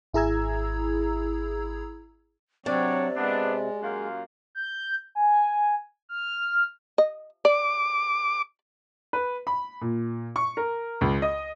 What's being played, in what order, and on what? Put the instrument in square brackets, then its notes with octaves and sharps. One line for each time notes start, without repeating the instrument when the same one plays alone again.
[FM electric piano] G#1 E4 G#4 A#5 E6 G#6
[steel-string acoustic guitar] C3 [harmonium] F#3 C4 [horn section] D4 C#5 [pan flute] D5
[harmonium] G#3 [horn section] B3 C4 D4
[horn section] F#2 A#3 F4
[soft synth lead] G6
G#5
F6
[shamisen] D#5
[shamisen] D5 [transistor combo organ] D6
[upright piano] B4
B5
A#2
C#6
A#4
C#2
D#5